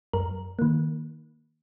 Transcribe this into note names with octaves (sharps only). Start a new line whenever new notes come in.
F#2 A#4
D#3 A#3